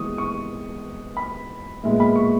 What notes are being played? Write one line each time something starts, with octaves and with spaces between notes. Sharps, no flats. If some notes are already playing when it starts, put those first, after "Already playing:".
Already playing: E3 G#3 B3 C#6 D#6
C#6
B5
A#2 G#3 B3 E5
B5
C#6